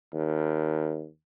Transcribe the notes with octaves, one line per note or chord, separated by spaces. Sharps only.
D#2